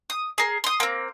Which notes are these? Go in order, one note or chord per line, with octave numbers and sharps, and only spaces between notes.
D#6
G#4 A#4
C6 D#6
A#3 C4